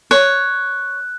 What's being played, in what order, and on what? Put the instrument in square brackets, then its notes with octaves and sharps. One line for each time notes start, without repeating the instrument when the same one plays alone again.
[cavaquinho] C#5 [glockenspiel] F#6